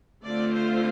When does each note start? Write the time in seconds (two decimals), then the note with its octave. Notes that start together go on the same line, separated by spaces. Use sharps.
0.23 D3 A3 C4 F4 D5
0.53 C5